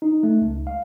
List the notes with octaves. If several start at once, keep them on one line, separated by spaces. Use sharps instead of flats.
D#4
A3
C#2
F5